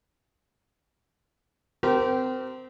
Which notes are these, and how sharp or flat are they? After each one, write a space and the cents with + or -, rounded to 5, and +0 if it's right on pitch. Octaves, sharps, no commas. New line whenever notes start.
C4 -20 G4 -30 A#4 +0